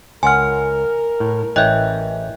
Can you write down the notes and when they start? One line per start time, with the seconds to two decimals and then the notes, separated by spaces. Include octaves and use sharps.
0.23 C#2 A#4 F#5 G#5 C6 F6
1.20 A2
1.56 A1 E3 C#4 D#5 E5 G5 F#6 G6